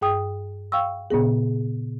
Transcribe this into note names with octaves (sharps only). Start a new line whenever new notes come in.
G2 G#4 G5 D#6
F5 G5 C#6 E6
A#2 C#3 B3 G#4